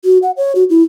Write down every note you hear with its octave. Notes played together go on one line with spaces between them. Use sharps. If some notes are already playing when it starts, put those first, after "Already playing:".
F#4
F#5
C#5
F#4
E4